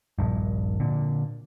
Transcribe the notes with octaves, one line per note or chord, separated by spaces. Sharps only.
D#1 A#1 G2
A#2 D3